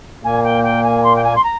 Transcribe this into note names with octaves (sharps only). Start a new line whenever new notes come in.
A#2 A#3 G#5
G5
G5
G#5
C6
G5
G#5
C6
A#5